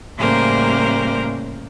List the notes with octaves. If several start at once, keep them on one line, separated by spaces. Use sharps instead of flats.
A2 C#3 G3 A#3 A#4 C5